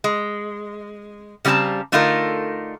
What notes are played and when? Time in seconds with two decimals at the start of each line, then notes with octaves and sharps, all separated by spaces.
0.04 G#3
1.45 C#3 G3 C4 G4 A5 A#5
1.92 D3 A3 D#4 F4 A4 A#4